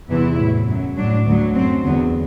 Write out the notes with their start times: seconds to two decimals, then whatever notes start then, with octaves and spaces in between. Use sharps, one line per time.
0.10 E2 C3 E3 E4
0.40 A2 F#3
0.68 F#2 F#3
0.97 A2 F#3 D4
1.27 D2 D3 F#3
1.56 F#2 F#3 C4
1.84 E2 D3 F#3 B3